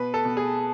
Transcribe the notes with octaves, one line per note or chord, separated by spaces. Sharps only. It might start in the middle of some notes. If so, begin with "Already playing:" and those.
Already playing: B2 B4
A4
B2
G#4